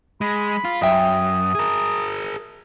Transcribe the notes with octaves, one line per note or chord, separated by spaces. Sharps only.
G#3 B5
F4
F#2 E5 G5 D#6
G#4 A#4